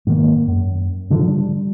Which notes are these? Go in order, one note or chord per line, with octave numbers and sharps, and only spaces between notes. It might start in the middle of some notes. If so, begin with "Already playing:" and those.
G#2 D#3 A#3
F#2
G#2 D3 D#3 F3
G3